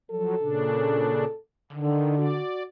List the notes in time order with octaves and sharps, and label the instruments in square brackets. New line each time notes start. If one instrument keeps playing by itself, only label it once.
[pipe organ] F3 F#3 [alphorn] A4
[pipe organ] A#2 C#3 D4
[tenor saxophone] D3 [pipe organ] D#3
[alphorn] F#4 [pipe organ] D5